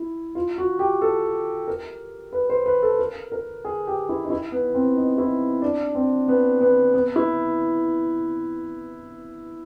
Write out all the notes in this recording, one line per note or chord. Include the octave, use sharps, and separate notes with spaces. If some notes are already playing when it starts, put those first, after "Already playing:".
Already playing: E4
F4
F#4
G4
A4
A#4
B4
C5
B4
A4
A#4
A#4
G#4
G4
E4
D#4
E4
B3
C4
D#4
E4
D4
C4
B3
B3
B3
E4